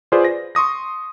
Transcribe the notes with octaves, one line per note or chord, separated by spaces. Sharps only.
F4 G#4 B4 C5 D5
A#6
C6 C#6 D#6 A#6